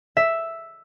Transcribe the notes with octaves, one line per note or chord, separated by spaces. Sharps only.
E5